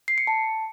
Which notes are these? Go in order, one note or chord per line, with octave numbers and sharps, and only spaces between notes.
C7
C#7
A5